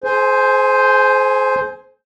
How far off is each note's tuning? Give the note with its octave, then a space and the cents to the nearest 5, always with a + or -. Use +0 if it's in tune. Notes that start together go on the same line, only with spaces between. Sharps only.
G#4 +40 C5 +0 G#5 +0